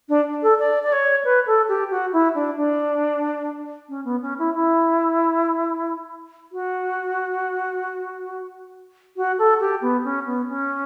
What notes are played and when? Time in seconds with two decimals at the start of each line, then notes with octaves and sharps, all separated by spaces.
0.09 D4
0.43 A4
0.59 D5
0.83 D5
0.93 C#5
1.25 B4
1.47 A4
1.69 G4
1.91 F#4
2.13 E4
2.35 D4
2.57 D4
3.89 C#4
4.05 B3
4.22 C#4
4.39 E4
4.55 E4
6.52 F#4
9.17 F#4
9.39 A4
9.60 G4
9.82 B3
10.04 C#4
10.26 B3
10.49 C#4